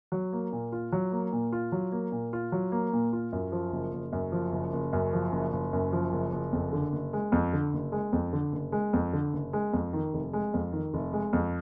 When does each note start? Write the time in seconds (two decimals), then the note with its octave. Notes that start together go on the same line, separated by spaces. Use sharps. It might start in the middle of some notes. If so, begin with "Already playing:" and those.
0.12 F#3
0.33 A#3
0.52 A#2
0.72 F4
0.92 F#3
1.12 A#3
1.32 A#2
1.52 F4
1.72 F#3
1.92 A#3
2.12 A#2
2.33 F4
2.52 F#3
2.72 A#3
2.93 A#2
3.13 F4
3.32 F#2
3.52 F3
3.72 F#1
3.93 F#1
4.12 F#2
4.32 F3
4.52 F#1
4.73 F#1
4.93 F#2
5.13 F3
5.32 F#1
5.53 F#1
5.73 F#2
5.93 F3
6.13 F#1
6.32 F#1
6.53 F2
6.73 D3
6.92 F#1
7.13 G#3
7.32 F2
7.53 D3
7.73 F#1
7.92 G#3
8.13 F2
8.33 D3
8.52 F#1
8.72 G#3
8.93 F2
9.13 D3
9.33 F#1
9.53 G#3
9.73 F2
9.93 D#3
10.14 F1
10.33 G#3
10.54 F2
10.72 D#3
10.94 F1
11.13 G#3
11.33 F2